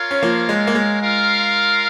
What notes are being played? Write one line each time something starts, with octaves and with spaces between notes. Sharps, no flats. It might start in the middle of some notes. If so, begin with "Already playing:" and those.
Already playing: F4 A#4 C#5 F5
C#4
F3 A#3
G#3
A#3
G#3
F4 A#4 F5